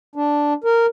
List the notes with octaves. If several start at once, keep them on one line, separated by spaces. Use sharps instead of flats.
D4
A#4